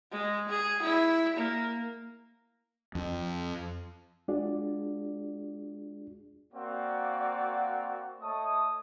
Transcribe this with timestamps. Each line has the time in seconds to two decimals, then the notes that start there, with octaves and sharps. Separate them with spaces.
0.12 G#3
0.49 G#4
0.83 E4
1.37 A#3
2.95 F2
4.28 G#3 D4 F4 F#4 G#4 D5
6.54 A#3 C4 F#4 D5 F5 F#5
8.22 A3 C#5 D#5 A5 D#6